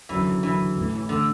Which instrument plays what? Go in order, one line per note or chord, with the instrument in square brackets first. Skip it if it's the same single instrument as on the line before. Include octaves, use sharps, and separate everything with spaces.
[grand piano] F#1 F#2 D3 F#3 D4 [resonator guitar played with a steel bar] E3
[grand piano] F#1 F#2 D3 F#3 D4 [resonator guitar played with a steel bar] E3
[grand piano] A1 A2 A3
[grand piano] A2 A3 [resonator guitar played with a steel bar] D3